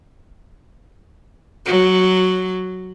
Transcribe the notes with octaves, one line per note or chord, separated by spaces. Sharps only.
F#3